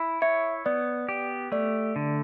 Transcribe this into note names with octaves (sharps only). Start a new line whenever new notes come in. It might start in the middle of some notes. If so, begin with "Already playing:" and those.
Already playing: E4
C#5 E5
B3 D5
G4
A3 D5
D3